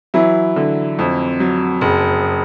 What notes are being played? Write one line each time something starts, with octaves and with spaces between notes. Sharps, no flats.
E3 F#3 E4
D3
F2
F#3
F#1